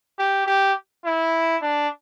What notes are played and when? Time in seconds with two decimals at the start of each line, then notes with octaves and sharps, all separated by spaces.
0.19 G4
0.46 G4
1.05 E4
1.62 D4